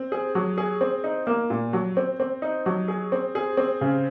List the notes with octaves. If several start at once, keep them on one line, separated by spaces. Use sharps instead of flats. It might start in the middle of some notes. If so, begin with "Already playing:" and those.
Already playing: C4
G#4
F#3
G#4
C4
D#4
A#3
A#2
F#3
C4
C4
D#4
F#3
G#4
C4
G#4
C4
C#3